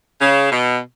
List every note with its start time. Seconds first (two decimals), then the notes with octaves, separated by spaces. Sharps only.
0.21 C#3
0.52 B2